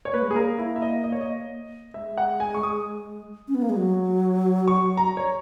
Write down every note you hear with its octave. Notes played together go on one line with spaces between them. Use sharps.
C#5
A#3 B4
G#3
A#3 G#4
A#4
E4
E5
D#5
D#5
C#5
D#5
G#3 E5
F#5
G#5
C#6
D#6
C#4
B3
A#3
G#3
F#3
C#6
A#5
C#5